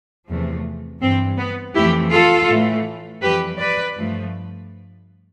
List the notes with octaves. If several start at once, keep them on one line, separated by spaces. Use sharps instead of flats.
E2 C3 F3 A3
G2 E3 G3 C4
B3
F2 E3 A3 E4 G4
F4 A4
A2 E3 A3
F2 E3 G3 G4 B4
B4 D5
G2 F3 A3